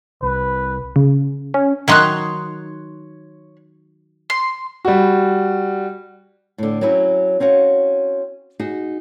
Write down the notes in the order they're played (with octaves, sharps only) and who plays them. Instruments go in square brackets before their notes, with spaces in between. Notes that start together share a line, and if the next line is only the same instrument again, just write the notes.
[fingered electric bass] C2 [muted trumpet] B4
[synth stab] C#3
C#4
[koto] D#3 F#3 D#4 [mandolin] C#5 C6 F#6
[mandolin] C6
[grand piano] G3 F#4
[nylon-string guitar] A2 D3
F#3 C4 C#4 E4
C4 C#4 F#4 F5
D#4 F#4 G#4